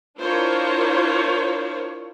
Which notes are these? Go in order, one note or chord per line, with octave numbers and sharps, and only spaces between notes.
D4 E4 F4 A#4 C5 C#5